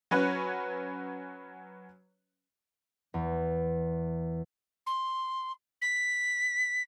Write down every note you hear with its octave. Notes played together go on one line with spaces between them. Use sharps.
F#3 C#4 F#4 B4 C#5 F#6
E2
C6
B6